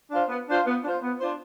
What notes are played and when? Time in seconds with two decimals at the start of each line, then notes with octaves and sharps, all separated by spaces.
0.11 D4 F4 C5
0.29 B3
0.47 D4 F4 C5
0.65 B3
0.83 D4 F4 C5
1.01 B3
1.19 D4 F4 C5